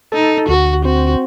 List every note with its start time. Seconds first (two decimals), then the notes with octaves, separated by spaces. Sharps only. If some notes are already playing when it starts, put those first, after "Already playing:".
0.12 D#4 A4
0.48 D2 F#4
0.85 C4 F#4